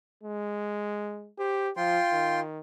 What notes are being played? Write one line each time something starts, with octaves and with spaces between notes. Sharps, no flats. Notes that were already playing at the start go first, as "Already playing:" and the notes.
G#3
G4 C5
F3 F4 G5 C6
D#3